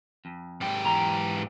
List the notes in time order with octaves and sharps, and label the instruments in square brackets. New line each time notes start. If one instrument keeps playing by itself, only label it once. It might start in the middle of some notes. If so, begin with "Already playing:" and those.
[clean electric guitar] F2
[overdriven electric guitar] G#2 G4
[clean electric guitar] E2 A#5